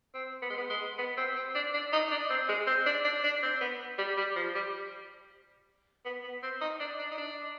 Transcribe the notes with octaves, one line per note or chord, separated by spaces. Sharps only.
C4
B3
G#3
B3
G#3
B3
C4
C4
D4
D4
D#4
D4
C4
G#3
C4
D4
D4
D4
C4
B3
G3
G3
F3
G3
B3
B3
C4
D#4
D4
D4
D#4
D4